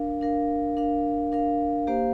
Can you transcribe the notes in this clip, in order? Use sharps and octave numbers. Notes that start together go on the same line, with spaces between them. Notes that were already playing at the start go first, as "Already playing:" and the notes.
Already playing: D4 A#4 F5
D4 A#4 F5
D4 A#4 F5
D4 A#4 F5
A#3 G4 C5 F5